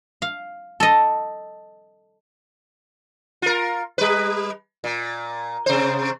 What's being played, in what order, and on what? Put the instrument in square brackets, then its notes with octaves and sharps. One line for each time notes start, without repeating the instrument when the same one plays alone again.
[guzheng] F5
A4 D#5
[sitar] F4 A#4
G3 B4
A#2
C3 C5